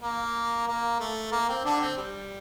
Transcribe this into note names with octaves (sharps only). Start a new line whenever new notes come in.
A#3
A#3
A3
A#3
C4
D3 D4
C4
G3